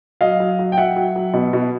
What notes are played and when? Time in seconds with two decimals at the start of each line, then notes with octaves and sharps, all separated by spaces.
0.21 F#3 D#5 F5
0.40 F#3
0.59 F#3
0.72 G5
0.78 F#3 E5 F#5
0.96 F#3
1.16 F#3
1.34 B2
1.53 B2